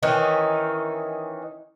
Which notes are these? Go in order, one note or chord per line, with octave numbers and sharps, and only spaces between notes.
D#3 E3 C#4 D#4